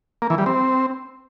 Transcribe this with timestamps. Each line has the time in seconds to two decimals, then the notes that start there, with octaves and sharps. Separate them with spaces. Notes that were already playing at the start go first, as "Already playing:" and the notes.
0.22 A#3
0.30 E3
0.38 G3
0.46 C4